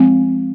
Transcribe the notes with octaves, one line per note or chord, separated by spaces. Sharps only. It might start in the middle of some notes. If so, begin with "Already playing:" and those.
Already playing: F3 G#3 C4